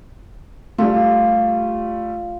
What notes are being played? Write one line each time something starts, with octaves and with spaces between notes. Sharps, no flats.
G3 A3 F4